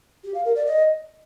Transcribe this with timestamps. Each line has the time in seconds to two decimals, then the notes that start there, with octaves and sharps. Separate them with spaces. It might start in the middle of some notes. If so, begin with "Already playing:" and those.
0.24 G4
0.34 F5
0.45 A#4
0.55 D5
0.66 D#5